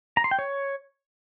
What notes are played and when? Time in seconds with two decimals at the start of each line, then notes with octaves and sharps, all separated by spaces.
0.17 A#5
0.24 C6
0.31 G5
0.39 C#5